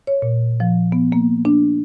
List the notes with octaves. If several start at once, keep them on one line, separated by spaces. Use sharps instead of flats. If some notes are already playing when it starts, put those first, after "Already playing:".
C#5
A#2
F3
B3
A#3
D4